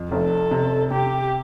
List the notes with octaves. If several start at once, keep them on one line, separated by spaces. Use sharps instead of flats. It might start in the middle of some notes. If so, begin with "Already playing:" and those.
Already playing: F2
F1 A4
C3
C3 G4